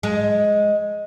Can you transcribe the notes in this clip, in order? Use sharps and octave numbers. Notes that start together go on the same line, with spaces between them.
G#3